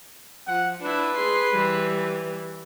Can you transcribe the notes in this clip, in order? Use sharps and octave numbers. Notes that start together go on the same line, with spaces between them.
F3 F#5
D4 E4 B4
G#4 C6
E3 G3